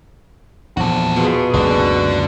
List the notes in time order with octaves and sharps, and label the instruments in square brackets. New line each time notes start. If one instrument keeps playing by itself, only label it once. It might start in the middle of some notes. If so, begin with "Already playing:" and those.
[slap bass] E2 A#2 F3 [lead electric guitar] F#4 A4
[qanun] B2 [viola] F4 G#4
[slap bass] F#1 C#2 [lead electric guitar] D3 D4 [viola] F#4